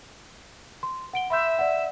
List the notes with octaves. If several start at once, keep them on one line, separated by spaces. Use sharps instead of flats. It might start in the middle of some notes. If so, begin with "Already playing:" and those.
C6
F#5 D7 G7
E5 B5 C6 G6
D5 F#5